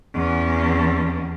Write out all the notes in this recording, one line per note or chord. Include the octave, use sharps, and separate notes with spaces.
E2 C#4